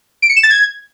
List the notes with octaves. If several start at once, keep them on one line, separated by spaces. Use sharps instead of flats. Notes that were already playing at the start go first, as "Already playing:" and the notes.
D7
C#7
E7
A6
G#6